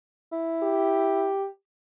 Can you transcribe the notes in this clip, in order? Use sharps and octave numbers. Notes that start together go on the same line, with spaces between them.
E4
G4